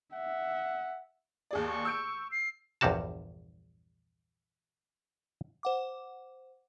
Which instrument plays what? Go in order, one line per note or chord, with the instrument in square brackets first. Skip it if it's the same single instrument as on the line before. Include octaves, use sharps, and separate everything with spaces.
[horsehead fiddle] E5 [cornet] F#5
[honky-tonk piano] D#2 G#4 D5
[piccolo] C#6
[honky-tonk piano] E6 G6 D7
[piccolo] C7
[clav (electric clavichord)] A#1 E2 G2 G3 F#4 A5
[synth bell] C5 F#5 D6